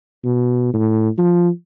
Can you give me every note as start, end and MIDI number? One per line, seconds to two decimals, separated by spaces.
0.25 0.74 47
0.74 1.09 45
1.18 1.49 53